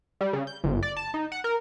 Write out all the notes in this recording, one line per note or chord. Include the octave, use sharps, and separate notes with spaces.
G3
C#3
G6
G1
D5
A5
D#4
F#5
A#4